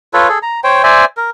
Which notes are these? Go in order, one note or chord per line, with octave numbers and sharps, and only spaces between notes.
F4 A4 B4 C#5
G#4 A4
A#5
C5 C#5 G5
C5 D5 E5 G#5
A#4